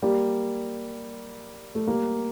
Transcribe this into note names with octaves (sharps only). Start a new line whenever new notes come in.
G3 A#3
A3
G3 A#3